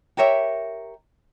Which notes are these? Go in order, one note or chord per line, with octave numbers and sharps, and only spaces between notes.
G4 A#4 C#5 E5